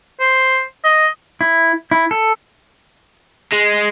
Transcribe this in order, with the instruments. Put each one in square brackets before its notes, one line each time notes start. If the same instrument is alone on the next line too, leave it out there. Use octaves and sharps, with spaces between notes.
[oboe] C5
D#5
[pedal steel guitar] E4
E4
A4
[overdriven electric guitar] G#3